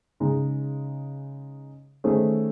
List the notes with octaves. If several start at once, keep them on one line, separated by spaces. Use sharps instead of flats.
C#3 G#3 D#4
D#3 A3 C#4 G#4 C5